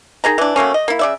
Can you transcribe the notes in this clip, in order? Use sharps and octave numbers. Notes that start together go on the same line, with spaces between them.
D#3 G#4 D#5 A#5
E3 D4
F#3 A3 A#3 C#4
D#5
A#3 E4
C#3 D5 E5